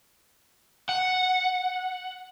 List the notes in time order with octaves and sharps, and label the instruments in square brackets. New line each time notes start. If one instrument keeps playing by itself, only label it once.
[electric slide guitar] F#5